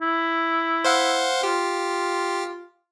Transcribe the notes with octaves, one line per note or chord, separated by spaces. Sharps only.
E4
C5 F5 F#5
F4 G4